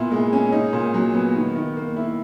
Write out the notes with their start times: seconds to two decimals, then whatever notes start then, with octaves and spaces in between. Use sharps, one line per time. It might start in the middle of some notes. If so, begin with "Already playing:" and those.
Already playing: A#2 B3 E4
0.12 G#3
0.33 C#4
0.52 D#4
0.73 A#2
0.94 F#3
1.14 B3
1.35 D#3
1.55 D#3
1.77 A#3
1.96 E4